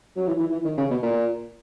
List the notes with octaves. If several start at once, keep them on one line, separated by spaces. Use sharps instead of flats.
F#3
E3
E3
E3
D#3
C#3
B2
A#2